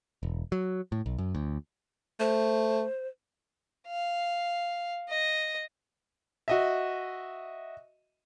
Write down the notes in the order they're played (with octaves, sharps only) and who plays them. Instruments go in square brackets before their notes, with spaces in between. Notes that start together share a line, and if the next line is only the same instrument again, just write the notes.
[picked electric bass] E1
F#3
A2
B1
F#2
D2
[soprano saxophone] A3 [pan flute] C5
[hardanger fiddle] F5
D#5
[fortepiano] F#4 D#5 E5